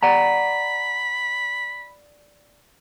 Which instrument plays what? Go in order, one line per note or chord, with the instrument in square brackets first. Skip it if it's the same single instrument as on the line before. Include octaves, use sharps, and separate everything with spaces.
[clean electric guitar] D5 F#5 A#5 [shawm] B5